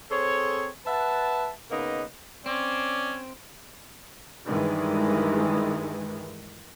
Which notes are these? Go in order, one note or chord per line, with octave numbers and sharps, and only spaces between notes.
C4 G#4 A4 C5 C#5
B4 E5 F#5 A5
C#3 A#3 B3 D#4 B4 D#5
C4 C#4 D5
G2 D#3 E3 G#3